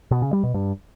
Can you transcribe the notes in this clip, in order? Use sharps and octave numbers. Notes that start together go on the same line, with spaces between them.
B2
C#3
G3
B2
G2